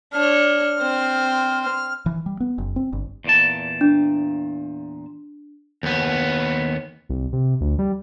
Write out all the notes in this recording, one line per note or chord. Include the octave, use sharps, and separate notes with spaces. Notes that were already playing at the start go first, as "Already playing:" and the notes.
D4 C#5 F6
C4 C5
F6
E3
G3
B3
F#1
C4
G1
E2 A#2 A5
D4
D#2 B3
C2
C3
D2
G3